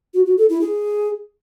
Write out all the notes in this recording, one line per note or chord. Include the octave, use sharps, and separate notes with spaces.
F#4
F#4
A4
E4
G#4